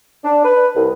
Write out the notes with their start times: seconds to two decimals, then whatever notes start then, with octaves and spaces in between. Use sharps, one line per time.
0.24 D4
0.45 B4
0.76 C2